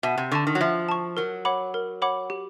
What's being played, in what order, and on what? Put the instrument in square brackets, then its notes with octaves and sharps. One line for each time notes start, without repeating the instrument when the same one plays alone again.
[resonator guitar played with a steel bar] B2 [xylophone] E5
[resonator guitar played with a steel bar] C3
[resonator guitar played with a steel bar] D3 [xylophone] A5 C#6
[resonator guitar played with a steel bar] D#3
F#3
[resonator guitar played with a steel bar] F3 [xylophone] E5
[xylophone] A5 C#6
[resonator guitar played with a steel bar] F#3 [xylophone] A#4
[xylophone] C#5 F#5 B5 D6
A#4
C#5 F#5 B5 D6
G4